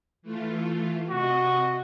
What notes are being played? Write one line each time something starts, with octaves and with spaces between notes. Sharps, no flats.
E3 A3 F4
C3 F#4 D#5